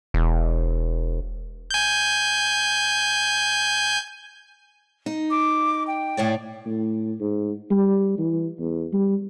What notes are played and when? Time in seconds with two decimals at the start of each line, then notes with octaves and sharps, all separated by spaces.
0.14 E1
1.70 G#5 G6
5.06 D#4
5.31 D6
5.87 G5
6.17 A2 C#5 D5
6.66 A2
7.20 G#2
7.71 G3
8.19 E3
8.59 E2
8.93 G3